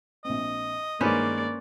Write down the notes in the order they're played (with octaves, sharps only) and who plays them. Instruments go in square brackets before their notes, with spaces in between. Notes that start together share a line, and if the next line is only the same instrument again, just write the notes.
[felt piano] A#1 C4 [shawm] D#5
[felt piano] G2 D#3 G#3 [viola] A#3 D5 [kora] C#4 B4 C5